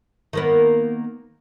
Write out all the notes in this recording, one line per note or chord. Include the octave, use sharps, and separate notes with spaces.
D#3 A#3 B3